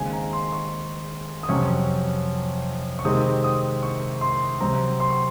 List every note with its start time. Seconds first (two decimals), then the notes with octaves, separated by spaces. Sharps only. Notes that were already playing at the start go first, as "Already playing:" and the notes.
Already playing: D#2 C#3 G#3 C4 G#5
0.13 A#5
0.33 C6
0.52 C#6
1.43 D#6
1.49 F2 C3 F#3 C#4 C#6
2.99 C#6
3.05 C3 D#3 G#3 C4 D#6
3.44 D#6
3.83 C#6
4.21 C6
4.61 C3 F#3 C4 A#5
5.00 C6
5.10 C#6